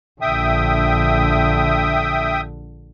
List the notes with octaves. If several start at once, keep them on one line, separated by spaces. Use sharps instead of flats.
A#1 D3 E5 G5 D#6